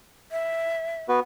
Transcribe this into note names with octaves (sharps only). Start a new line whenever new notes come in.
E5
B3 F#4 B4